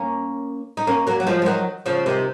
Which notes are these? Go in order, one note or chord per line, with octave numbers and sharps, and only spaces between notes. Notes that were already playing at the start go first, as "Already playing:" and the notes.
Already playing: A#3 C#4
D#4
A#3 C#4
F#3 A#3
F#3
F3 G#3
G#3
D#3 F#3
C#3 F3
C3 D#3